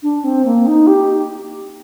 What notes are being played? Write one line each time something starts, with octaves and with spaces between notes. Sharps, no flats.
D4
C4
A#3
D#4
G4